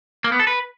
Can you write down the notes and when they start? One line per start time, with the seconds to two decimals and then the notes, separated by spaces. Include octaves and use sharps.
0.24 A#3
0.32 B3
0.39 A4
0.47 B4